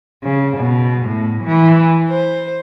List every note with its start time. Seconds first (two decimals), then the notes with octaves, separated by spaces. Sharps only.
0.23 C#3
0.57 B2
1.05 A2
1.43 E3
2.09 C5